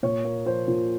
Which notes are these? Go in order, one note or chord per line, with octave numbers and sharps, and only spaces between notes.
A#2 C#5
A#3
F3 C5
A#2